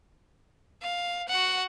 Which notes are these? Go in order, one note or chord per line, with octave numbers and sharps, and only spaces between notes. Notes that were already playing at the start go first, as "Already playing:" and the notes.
F5
F#4 F#5